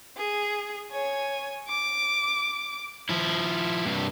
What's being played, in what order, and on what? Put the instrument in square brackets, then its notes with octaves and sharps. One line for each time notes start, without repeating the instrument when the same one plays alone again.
[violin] G#4
C#5 G#5
D6
[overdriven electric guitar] F3 E4
G2 C3